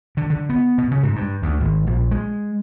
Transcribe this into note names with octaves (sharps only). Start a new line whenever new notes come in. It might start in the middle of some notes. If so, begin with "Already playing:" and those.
D3
D3
B3
B2
C#3
G#2
G2
D2
G#1
A#1
G#3